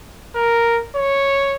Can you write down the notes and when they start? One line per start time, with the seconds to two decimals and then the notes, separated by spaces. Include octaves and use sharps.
0.35 A#4
0.96 C#5